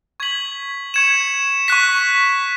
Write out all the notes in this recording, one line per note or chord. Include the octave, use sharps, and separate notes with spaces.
C#6 G#6 B6 F#7
C#6 G#6 C#7 E7
C#6 F#6 B6